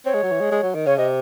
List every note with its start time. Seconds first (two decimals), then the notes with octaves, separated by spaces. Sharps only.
0.05 C4 C#5
0.14 G#3
0.23 F#3
0.31 E3
0.40 G#3
0.52 G#3
0.63 F#3
0.75 D#3
0.86 C#3 C#5
0.98 C3 D#5